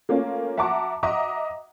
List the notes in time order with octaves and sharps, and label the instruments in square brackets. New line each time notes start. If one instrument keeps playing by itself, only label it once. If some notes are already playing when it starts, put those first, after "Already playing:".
[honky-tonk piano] A3 A#3 C#4 F4
E5 F#5 A5 A#5 D6
D#5 E5 F#5 A#5 D6 D#6